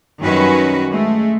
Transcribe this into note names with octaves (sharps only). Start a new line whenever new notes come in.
F#2 D#3 G3 C#4 F#4 B4
G#3 A3